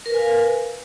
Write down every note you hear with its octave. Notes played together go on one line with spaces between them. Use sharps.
A#4 B4 F5 G#5